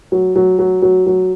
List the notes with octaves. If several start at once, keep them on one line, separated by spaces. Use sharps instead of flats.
F#3
F#3
F#3
F#3
F#3